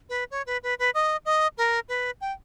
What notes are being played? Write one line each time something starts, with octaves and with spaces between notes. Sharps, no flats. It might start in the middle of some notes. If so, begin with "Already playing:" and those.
B4
C#5
B4
B4
B4
D#5
D#5
A#4
B4
G5